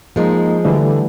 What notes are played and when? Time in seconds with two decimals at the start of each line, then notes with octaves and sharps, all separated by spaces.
0.16 F3 G#3 A#3 D#4
0.65 D3 E3 G3 A3